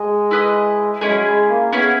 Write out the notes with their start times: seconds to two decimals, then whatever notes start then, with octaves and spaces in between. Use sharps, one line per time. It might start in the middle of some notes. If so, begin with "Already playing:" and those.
Already playing: G#3 D#5
0.31 E4 B4 D#5
1.01 G#3 C#4 E4 G#4
1.08 F#3
1.16 G#3
1.26 G#3
1.50 A#3
1.73 B3 C#4 E4 G#4